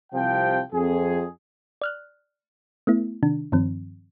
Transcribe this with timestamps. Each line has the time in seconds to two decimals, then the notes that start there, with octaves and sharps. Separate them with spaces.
0.13 C2 C3 F3 G5
0.73 F2 G#4
1.82 D5 F6 F#6
2.87 A3 B3 E4
3.23 C3 D#3 D4
3.52 G2 D#3 F3 C4